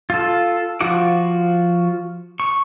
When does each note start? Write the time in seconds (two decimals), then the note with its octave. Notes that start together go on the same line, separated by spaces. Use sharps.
0.10 F4 A4
0.81 F3 F4 F#4 F#5 D6
2.40 C#6